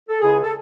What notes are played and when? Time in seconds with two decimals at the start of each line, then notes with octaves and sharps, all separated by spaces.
0.09 A4
0.21 C#2 C#3 G#3 E4 G#4
0.43 A4